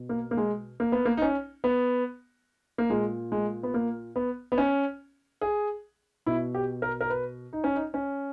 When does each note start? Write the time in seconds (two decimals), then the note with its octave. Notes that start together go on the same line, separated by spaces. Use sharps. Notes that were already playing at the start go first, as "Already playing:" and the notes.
Already playing: B2
0.09 A#3
0.31 A#3
0.37 G#3
0.80 A#3
0.92 B3
1.05 A#3
1.17 D#4
1.22 C#4
1.64 B3
2.78 A#3
2.90 A#2 G#3
3.32 G#3
3.63 B3
3.74 A#3
4.16 B3
4.52 B3
4.58 C#4
5.42 G#4
6.26 B2 E4
6.55 G4
6.82 A#4
7.01 A#4
7.10 B4
7.53 D#4
7.64 C#4
7.75 D#4
7.94 C#4